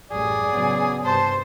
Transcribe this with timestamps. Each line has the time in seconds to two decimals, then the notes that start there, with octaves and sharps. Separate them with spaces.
0.11 A1 F#2 G3 G#4 D5
0.49 C#3 F#3 B3
1.05 G2 C3 C5 A5